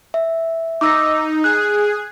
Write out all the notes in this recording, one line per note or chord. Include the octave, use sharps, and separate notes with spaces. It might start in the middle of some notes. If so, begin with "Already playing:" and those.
E5
D#4 D6 E6 A#6
G#4 F#6